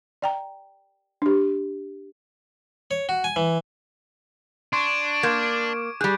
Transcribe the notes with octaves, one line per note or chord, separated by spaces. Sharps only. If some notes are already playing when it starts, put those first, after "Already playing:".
D5 G5 A#5
D4 G4
C#5
F#4
G#5
E3
D4 C6 C#6 G#6 D7
A#3 C6 D6 G6 G#6 D7
G3 G#4 F#6 G6